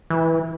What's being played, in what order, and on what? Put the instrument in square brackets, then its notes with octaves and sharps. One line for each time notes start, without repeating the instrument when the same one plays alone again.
[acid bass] E3